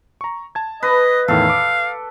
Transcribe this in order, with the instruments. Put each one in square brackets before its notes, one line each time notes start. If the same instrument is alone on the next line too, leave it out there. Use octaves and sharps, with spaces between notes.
[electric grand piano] A#5 C#6
A5 G#6
[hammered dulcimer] B4 [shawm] D#5
[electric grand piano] E2 A2 D#3 [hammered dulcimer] A4 [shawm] F5
[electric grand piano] D6